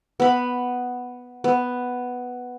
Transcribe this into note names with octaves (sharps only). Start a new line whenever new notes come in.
B3 B5
B3